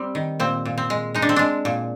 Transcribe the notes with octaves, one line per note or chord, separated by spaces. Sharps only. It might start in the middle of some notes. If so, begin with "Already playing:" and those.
Already playing: G3 C4
D#3
A#2 C4
A#2
C4
G#3
G#3 D#4
D4
C4
G#3 D4
A#2